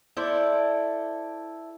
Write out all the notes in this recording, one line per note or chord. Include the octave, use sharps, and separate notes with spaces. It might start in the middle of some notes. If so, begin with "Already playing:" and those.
E4 A4 C5 D5